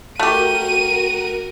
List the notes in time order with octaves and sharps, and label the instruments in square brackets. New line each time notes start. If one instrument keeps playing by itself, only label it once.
[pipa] A3 G4 [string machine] F#4 A#4 [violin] D#7